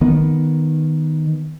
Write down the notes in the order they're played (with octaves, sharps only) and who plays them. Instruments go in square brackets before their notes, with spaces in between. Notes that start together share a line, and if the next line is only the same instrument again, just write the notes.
[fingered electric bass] D#3 B3